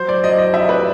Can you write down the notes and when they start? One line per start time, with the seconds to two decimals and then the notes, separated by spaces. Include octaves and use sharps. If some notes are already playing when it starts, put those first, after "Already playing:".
Already playing: F#3 C5
0.09 D5
0.24 F#3 D#5
0.38 D#5
0.53 C3 E5
0.69 B4